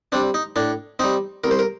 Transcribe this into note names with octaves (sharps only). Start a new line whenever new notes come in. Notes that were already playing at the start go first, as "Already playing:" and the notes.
G3 C4 D4
D#4
A2 D4
G3 C4 D#4
C2 A#4
C5
A#4